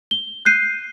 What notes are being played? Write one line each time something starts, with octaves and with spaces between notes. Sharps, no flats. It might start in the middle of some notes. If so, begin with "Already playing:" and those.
G7
F#6 G6 C7 D#7